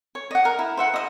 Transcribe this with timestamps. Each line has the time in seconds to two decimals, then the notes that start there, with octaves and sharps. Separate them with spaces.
0.15 C#5
0.31 D#5 F#5
0.45 A#4
0.59 E4
0.77 C5 E5 F#5
0.94 D#5 E5 D#6